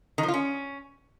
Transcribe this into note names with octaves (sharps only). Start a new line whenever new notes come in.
D#3
F3
F4
C#4